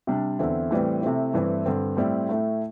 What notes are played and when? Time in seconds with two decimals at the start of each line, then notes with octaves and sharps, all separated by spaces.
0.07 C3 G3 D4
0.39 E2 D3 C4 E4
0.71 A2 E3 G3 C4
1.02 C3 A3 C4 E4
1.34 G2 E3 A3 C4 E4
1.66 G2 D3 C4
1.97 A2 G3 C4 E4
2.29 A2 A3 E4